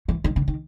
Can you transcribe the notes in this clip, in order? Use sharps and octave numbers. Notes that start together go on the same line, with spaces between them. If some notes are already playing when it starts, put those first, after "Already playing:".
E3
D#3
D3
D#3